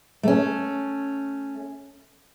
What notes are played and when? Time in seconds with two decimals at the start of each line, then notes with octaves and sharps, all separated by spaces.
0.23 A3 C#4